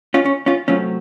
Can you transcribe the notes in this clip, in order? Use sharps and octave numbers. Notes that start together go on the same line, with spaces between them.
C#4 F4
C#4
C#4 F4
C3 F#3 A3 C4 C#4 F4